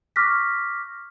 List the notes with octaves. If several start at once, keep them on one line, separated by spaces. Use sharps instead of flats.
C#6 D6 F6 F#6 A#6 B6